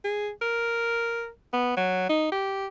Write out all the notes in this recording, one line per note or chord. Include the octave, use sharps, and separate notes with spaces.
G#4
A#4
B3
F#3
D#4
G4